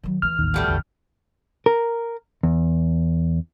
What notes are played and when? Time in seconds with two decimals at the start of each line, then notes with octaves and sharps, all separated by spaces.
0.03 D#3 F#3
0.22 D2 E3 F6
0.39 A1 D#2 D#3
0.54 B2 G3 A3
0.67 A1 E2 D3
1.66 A#4
2.43 E2